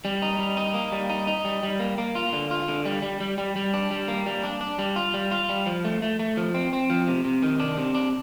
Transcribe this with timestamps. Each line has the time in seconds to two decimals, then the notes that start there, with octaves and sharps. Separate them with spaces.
0.05 G3
0.22 D#4
0.39 G3
0.57 D#4
0.74 A#3
0.92 G3
1.10 D#4
1.27 D#4
1.45 G3
1.63 G3
1.80 A#3
1.98 A#3
2.15 F4
2.33 D3
2.51 F4
2.68 D3
2.85 G3
3.02 G3
3.20 G3
3.38 G3
3.56 G3
3.74 D4
3.91 G3
4.08 A#3
4.26 G3
4.43 D4
4.61 D4
4.78 G3
4.96 F4
5.14 G3
5.31 F4
5.49 G3
5.66 F3
5.85 A3
6.02 A3
6.19 A3
6.37 F3
6.54 C4
6.73 C4
6.90 F3
7.08 C3
7.25 C3
7.42 D#3
7.60 D4
7.77 C3
7.95 D4